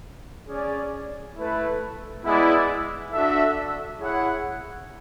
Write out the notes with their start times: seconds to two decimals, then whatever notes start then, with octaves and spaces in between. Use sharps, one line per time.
0.47 C#4 G#4 D5
1.36 A3 E4 B4
2.23 G#3 B3 E4 G#4 D5
3.12 D4 F#4 A4 E5
4.00 E4 G#4 C#5 F#5